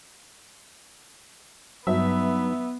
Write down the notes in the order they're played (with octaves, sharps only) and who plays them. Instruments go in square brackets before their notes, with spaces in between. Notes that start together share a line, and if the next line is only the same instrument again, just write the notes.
[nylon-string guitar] G2 D#4 F#5 [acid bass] F#3 [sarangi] B3 [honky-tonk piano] E5